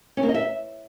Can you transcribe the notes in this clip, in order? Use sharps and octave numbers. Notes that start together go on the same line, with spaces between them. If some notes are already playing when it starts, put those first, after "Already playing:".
C#4
A#3
D#5
E5